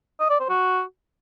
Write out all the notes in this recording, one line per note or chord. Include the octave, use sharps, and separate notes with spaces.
D#5
D5
C5
F#4